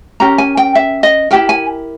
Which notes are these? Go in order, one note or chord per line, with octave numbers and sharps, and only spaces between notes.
C#4 G4 A#4 A#5
G#5
G5
E5
D#5
E4 G4 A#4 G5
G#5